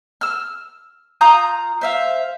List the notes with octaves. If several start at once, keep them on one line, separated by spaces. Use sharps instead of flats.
E6 F6
F4 A#5 D#6 G6
C5 E5 F5